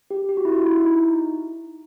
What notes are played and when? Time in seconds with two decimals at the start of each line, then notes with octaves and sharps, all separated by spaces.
0.11 G4
0.29 G4
0.37 F#4
0.45 E4
0.52 F#4
0.66 E4
0.85 D#4